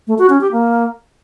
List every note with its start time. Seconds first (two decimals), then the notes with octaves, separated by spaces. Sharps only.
0.07 A3
0.19 F#4
0.30 C#4
0.41 G4
0.52 A#3